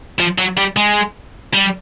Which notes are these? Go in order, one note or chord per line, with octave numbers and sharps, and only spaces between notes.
F3
F#3
G3
G#3
G3